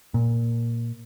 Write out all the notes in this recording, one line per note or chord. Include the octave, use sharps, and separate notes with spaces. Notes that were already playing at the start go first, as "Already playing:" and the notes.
A#2